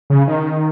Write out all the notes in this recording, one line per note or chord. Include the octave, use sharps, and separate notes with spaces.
C#3
D#3